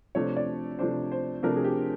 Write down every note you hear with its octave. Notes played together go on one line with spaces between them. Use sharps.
C3 F3 A3 D4 C#5
D5
C3 F3 A3 D4 C5
C5
C3 F3 A3 D4 A#4
G#4
G4